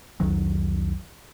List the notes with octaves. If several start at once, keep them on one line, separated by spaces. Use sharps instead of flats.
C2 F2 D#3 F#3